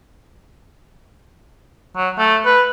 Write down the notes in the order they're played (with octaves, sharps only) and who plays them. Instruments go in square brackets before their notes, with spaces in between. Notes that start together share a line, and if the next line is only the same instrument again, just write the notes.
[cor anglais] F#3
A3
B4